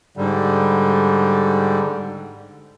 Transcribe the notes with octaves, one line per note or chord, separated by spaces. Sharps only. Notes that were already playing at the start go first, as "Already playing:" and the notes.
G#2 D3 G3